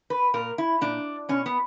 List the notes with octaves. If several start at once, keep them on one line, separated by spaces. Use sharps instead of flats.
B4
A#2 A#4
E4
A#2 D4
B2 C#4
B3